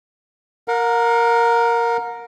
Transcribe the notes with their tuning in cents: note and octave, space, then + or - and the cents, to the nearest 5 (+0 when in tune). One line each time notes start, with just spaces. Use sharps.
A#4 +0 F#5 -45